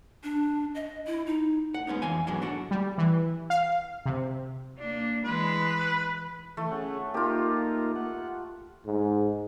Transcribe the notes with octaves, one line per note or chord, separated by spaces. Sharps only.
D4
D#5
E4
D#4
F#5
G#3 B3 C#4 D#4
F2 E3 F5 G#5
G#2 B2 E3 F#3 G#3 D4
D3 D4 F#4
G3
E3
F5
C3
A#3 D4
E3 G#3 B4
E3 A3
C#4 G#4 F#5
A#3 D#4 F4 G4 A#4
F#5
G#2